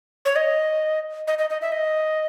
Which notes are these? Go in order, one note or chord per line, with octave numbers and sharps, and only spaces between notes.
C#5
D#5
D#5
D#5
D#5
E5
D#5